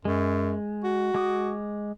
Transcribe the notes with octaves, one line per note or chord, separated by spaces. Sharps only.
F#2 G#3
F#4
G#3 D6 D#6